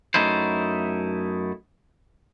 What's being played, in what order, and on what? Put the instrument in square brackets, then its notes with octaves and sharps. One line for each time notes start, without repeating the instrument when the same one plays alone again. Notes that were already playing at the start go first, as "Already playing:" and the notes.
[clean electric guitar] F#2 A3 D#4 E4 C5